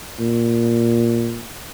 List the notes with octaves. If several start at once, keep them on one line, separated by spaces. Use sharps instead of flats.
A#2